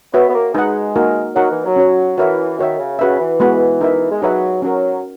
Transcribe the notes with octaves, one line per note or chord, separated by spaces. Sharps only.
B3 F#4 C#5 E5
B3
A#3
G#3 D#4 G#4 B4 D#5 F#5
A#3 D#4 F#4 A#4
F#3 D#4 A#4 D#5 F#5
E3
F#3
C#4 F#4 C#5
E3 F#4 A#4 C#5 E5
D#3 F#4 C#5 E5
C#3
C#3 F#4 B4 E5
E3
G#3 B3 F#4 B4
D#4 A#4 E5
G#3
F#3 D#4 G#4 B4 E5
F#3 C#4 F#4 A#4